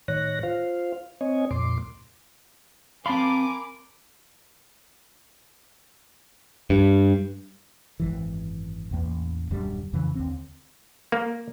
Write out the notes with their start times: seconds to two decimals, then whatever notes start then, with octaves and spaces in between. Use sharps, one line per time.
0.08 A2 D#3 C#5 F#6 A#6
0.43 F4 C5 F5
1.21 C4 C#5 D#5 G#5
1.51 F2 A#2 C6 D6
3.06 C4 A#4 F5 G#5 A5 B5 C6 D6
6.70 G2
8.00 G#1 F#2 E3
8.91 A1 E2 A#3
9.51 D#1 F#2 D3 G3
9.93 F2 C#3 E3
10.15 D#2 D3 C4
11.12 A#3